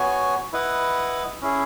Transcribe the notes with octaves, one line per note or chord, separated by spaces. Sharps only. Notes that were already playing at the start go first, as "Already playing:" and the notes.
Already playing: B3 F#4 C#5 G#5
E4 B4 D#5 F#5
C#4 E4 G#4